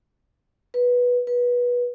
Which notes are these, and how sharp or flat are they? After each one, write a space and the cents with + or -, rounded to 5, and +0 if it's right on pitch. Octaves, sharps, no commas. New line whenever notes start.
B4 -10
B4 -20